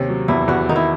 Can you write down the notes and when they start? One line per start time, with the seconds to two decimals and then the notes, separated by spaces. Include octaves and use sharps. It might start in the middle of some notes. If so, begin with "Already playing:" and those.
Already playing: D#2 C3 C#4
0.09 F#3
0.28 E2 E4
0.48 E2 F#4
0.69 D#3 D#4
0.76 E4